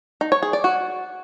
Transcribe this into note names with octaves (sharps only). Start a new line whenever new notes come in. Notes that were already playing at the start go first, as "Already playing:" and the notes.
D#4
C#5
G#4
D5
F#4